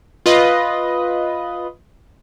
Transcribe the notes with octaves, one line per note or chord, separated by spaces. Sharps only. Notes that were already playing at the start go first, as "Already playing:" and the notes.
F4 B4 D#5